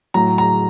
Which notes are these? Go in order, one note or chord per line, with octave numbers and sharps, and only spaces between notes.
A2 F#3 A#5
A#5